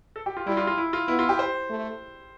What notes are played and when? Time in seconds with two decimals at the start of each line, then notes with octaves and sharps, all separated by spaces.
0.16 A4
0.26 G4
0.37 F4
0.46 G3 E4
0.57 F4
0.67 F4
0.78 E4
0.93 F4
1.08 B3 E4
1.19 F4
1.29 G4
1.39 C5
1.70 A3